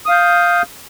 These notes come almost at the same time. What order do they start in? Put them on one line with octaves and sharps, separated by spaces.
D#6 F5 G6